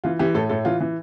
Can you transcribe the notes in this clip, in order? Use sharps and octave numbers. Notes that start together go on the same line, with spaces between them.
E3 F4
E3 G4
A2 A4
A2 A4
E3 F4
E3